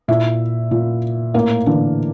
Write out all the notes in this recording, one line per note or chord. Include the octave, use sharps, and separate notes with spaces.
A#2 E4 E5
A#2
A2 A#3 A#4
D3 E3 D4